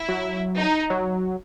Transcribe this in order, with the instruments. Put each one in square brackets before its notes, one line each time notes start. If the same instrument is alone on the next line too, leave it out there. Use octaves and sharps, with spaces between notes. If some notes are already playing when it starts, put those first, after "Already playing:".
Already playing: [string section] E4
[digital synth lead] F#3
[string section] D#4
[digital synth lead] F#3